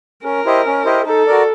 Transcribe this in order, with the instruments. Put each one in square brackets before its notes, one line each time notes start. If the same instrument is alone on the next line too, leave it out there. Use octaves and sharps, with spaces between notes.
[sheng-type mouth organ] C#4 [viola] A#4
[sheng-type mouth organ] E4 G4 C5 D#5
C#4
E4 G4 C5 D#5
[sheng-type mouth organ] D#4 [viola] A4
[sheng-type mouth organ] F#4 A#4 D5